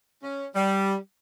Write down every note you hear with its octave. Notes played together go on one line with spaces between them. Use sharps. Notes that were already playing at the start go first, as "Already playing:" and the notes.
C#4
G3